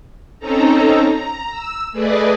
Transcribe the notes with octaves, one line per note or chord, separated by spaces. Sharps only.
C4 C#4 D#4 A4 A#5
A#5
E6
A3 G#4 B4 D5 D#5